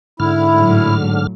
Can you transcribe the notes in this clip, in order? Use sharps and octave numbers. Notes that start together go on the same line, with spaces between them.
G#2 D3 E4 F6
A2 F#3